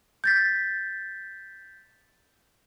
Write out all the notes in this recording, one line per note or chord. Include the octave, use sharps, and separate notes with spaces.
G6 A6 B6